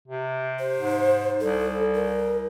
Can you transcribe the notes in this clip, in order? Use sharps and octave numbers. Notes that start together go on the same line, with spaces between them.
C3
C5
G#2
C2 A4
A#4